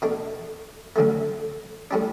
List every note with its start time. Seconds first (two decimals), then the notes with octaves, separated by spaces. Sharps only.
0.02 B2 A3 D4
0.96 D2 D3 F#3 A3
1.91 A2 G3 D4